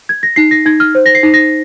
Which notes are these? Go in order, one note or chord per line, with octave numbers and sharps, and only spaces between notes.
G#6
A#6
D#4 C7
A#6
D#4 G#6
F6
C5
A#6
C7
D#4
A#6